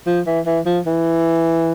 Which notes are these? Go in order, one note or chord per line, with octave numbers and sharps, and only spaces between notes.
F3
E3
E3
F3
E3